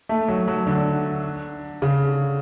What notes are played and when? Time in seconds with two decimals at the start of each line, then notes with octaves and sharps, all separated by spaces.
0.09 A3
0.28 F#3
0.48 F#3
0.67 D3
1.82 C#3